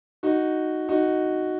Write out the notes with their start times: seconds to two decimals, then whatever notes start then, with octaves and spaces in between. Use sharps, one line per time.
0.23 D#4 F#4
0.89 D#4 F#4